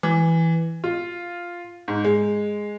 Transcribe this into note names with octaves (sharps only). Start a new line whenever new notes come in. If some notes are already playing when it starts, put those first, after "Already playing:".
E3
F4
G#2
G#3